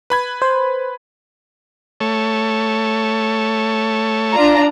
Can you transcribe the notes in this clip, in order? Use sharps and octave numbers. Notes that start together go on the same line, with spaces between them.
B4 B5 G#6
C5
A3 C#5 A5
D4 F4 A#5